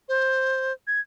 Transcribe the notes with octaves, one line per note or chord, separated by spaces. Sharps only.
C5
G#6